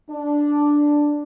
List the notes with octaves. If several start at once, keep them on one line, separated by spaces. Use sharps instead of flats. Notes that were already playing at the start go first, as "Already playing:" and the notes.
D4